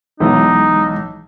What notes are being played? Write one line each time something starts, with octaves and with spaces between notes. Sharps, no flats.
B1 E3 G#3 D#4